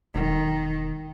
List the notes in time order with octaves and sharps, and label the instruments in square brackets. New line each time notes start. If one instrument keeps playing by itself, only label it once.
[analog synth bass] E1 [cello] D#3